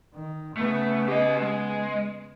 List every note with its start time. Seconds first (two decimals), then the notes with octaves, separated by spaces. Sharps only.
0.14 D#3
0.57 C#3 A3 B3
1.08 G4 D#5
1.41 G#3